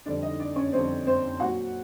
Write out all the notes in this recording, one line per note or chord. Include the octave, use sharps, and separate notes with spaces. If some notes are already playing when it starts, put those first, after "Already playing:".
F2 D3 G3 D4 D5
D#4 D#5
D4 D5
C#4 C#5
F2 D3 G3 C4 C5
C4 C5
A#2 F#3 F#4 F#5